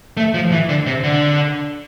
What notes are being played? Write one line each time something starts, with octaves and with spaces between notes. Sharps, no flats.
A3
F3
E3
D3
C3
D3